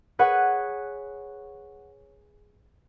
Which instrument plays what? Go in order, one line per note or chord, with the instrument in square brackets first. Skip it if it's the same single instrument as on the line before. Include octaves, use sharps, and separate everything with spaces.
[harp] G#4 B4 C#5 F#5